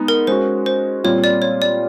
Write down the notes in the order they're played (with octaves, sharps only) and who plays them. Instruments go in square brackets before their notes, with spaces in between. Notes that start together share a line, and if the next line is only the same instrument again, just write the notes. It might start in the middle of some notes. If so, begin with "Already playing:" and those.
Already playing: [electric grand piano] G#3 B3 D#4
[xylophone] A#4
[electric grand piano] G#3 C#4 F#4 [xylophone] C5
[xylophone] C5
[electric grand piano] A#2 G3 C4 F4 [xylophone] C#5
[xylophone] D5
C#5
D5